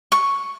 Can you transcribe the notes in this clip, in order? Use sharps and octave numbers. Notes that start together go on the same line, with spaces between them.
C#6